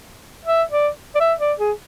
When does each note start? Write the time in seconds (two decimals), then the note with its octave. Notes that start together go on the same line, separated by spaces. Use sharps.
0.45 E5
0.70 D5
1.15 D5
1.20 E5
1.40 D5
1.58 G#4